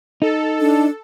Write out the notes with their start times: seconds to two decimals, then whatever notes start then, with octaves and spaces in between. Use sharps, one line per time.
0.22 D#4 A4
0.61 D4